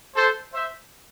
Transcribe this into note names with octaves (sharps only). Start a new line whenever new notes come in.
A4 C5
C5 E5